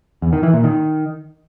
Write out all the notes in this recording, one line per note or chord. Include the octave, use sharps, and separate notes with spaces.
E2
D#3
E3
A#2
D#3